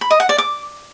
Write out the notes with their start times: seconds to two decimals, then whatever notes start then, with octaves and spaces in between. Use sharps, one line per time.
0.01 B5
0.11 D#5
0.20 F#5
0.29 D5
0.38 D6